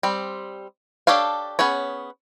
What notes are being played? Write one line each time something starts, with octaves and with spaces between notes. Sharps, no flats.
G3 C4
D4 G4 A4 C#5 F5
B3 C#4 G#4 C#5